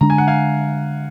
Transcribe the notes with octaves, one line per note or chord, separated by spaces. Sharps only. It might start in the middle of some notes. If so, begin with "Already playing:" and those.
D3 G#3 D4 A#5
G#5
F#5
F5 G#5